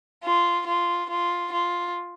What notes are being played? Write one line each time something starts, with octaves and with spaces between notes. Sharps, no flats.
F4
F4
F4
F4